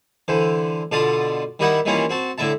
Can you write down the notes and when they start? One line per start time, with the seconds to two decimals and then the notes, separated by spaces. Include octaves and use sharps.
0.28 D3 E3 C5
0.92 B2 D3 F4 D5 A5 D#6
1.59 D#3 G3 E4 G4 D#5 F#5
1.85 D#3 E3 G3 A#3 C#4 F4
2.09 C4 F#4 A5
2.38 A2 D3 E4 E5 A5